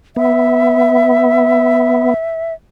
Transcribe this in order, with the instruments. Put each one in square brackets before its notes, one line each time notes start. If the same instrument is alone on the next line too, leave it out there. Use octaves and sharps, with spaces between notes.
[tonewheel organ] B3 [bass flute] E5